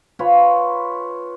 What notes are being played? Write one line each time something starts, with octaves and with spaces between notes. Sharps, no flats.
F4 B4 C#5 G#5